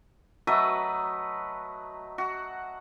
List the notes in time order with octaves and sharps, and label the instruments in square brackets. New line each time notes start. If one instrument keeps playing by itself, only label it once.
[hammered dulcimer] F#3 A3 B4 D#5
F#4